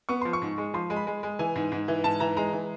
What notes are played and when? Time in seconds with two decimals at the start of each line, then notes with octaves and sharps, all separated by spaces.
0.09 B3 C#6
0.22 F3 C6
0.33 C#6
0.42 G#2
0.58 G#3
0.74 F3 C6
0.90 G#3
0.96 B5
1.07 G#3
1.23 G#3
1.39 E3 G#5
1.55 G#2
1.72 G#2
1.88 E3
2.04 G#2 A5
2.20 E3 A#5
2.37 G#3 A#5
2.53 E3